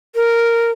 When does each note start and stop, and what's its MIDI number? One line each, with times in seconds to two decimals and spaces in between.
0.15 0.71 70